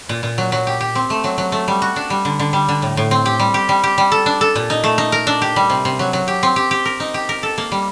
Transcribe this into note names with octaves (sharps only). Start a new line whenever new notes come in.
A#2
A#2
F#3
F#3
G4
G4
C4
A3
F#3
F#3
A3
G3
F#4
D4
G3
D3
D3
G3
D3
A2
A2
C4
G4
G3
G4
G3
G4
G3
A4
D4
A4
A#2
D#4
A3
D#4
A#4
D4
G4
G3
C3
C3
F#3
F#3
G4
C4
G4
G4
A#4
D#4
G4
A#4
A4
A#3
G3